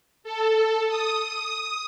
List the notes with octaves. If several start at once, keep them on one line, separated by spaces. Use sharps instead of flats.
A4
D#6